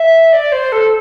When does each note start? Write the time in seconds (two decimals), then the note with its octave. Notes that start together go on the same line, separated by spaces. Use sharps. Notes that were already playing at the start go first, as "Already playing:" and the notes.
Already playing: E5
0.32 D5
0.52 C5
0.72 A4